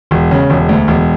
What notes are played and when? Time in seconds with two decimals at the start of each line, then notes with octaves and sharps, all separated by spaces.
0.11 E1
0.31 C#3
0.50 E1
0.69 D2
0.88 E1